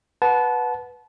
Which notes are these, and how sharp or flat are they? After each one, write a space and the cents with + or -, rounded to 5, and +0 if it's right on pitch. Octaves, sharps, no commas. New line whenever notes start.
B4 +0 F#5 -15 A5 -25